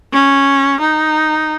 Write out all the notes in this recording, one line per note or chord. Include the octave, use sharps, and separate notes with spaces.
C#4
D#4